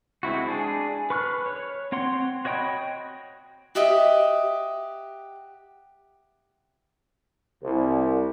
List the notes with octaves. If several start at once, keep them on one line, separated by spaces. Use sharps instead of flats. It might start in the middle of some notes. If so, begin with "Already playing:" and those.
G#3 C4 E4 F#4
D4 G#4
B4 C#6 F6 F#6
C#5
C4 C#5 F#5 C6
F#4 C#5 D#5 G5 B5
F#4 G4 D#5 E5
C2